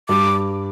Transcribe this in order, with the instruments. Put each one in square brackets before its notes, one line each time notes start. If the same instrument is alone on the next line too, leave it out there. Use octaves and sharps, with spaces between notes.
[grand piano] G2 [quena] D6